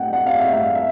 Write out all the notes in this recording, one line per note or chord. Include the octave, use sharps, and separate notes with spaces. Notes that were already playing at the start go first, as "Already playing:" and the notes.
Already playing: F#5 G5
F#5
F5
E5
F5
E5